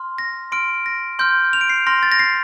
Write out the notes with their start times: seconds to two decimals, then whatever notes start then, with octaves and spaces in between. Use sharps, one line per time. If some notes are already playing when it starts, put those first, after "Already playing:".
Already playing: C6 F6
0.18 A#6
0.52 C6 F6 D7
0.86 A#6
1.19 C6 F6 G6
1.53 F7
1.61 D7
1.69 C7
1.87 C6 F6 A#6
2.03 A6
2.12 A#6
2.19 C7